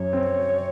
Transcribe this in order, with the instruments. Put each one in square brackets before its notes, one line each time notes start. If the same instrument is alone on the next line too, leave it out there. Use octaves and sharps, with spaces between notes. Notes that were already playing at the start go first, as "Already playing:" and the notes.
Already playing: [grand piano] F#2 [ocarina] C#5
[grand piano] C4